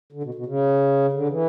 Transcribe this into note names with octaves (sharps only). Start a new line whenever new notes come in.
D3
B2
B2
C#3
D3
E3